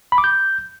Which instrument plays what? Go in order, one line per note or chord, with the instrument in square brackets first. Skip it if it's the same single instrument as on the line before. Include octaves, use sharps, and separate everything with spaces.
[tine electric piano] B5
D6
G6